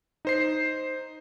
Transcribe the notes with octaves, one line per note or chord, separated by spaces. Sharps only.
D#4 C5 C7